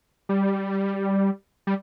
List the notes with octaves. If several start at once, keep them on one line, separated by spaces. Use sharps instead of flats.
G3
G3